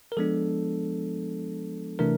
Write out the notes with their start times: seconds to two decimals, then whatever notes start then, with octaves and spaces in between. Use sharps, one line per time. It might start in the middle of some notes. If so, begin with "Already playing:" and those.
0.12 A#4
0.17 F3 G#3 B3 D4 A4
1.99 C3 E3 A3 D4 A#4